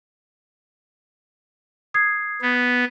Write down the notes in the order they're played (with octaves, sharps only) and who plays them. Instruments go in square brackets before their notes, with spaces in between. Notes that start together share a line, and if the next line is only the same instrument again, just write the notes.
[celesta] D#6 G#6 C7
[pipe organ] B3